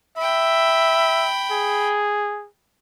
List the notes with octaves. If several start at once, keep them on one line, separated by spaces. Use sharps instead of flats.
E5 G5 B5
G#4